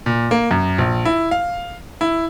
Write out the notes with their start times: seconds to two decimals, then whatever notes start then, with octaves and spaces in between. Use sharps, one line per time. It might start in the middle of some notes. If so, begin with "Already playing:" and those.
0.06 A#2
0.31 A#3
0.51 F#2
0.78 A#1
1.05 E4
1.31 F5
2.01 E4